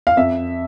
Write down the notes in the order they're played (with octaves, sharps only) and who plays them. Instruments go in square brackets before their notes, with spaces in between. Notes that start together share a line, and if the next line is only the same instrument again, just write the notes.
[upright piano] F5
F2 E5